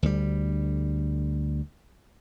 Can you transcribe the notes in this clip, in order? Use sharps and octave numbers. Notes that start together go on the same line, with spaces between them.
D2 G3